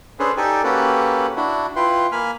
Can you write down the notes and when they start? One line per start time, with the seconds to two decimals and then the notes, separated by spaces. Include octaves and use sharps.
0.19 C#4 D4 G#4 A4 B4 C5
0.37 D#4 G4 A4 D5 G#5
0.64 A#3 C#4 F#4 G4 A4 B4
1.37 D4 E4 F#4
1.76 E4 F4 B4 G5 C6
2.12 A#3 G#5 B5 F6